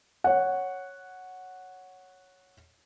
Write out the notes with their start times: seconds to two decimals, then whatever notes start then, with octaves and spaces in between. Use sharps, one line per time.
0.24 C#5 F#5